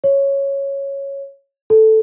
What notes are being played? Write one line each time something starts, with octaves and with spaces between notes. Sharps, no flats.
C#5
A4